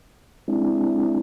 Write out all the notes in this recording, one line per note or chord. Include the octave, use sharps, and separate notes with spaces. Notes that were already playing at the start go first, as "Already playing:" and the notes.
G#3 C4 D4 E4